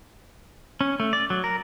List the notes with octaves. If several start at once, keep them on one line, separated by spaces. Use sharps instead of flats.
C#4
A3
D5
F#3
A#4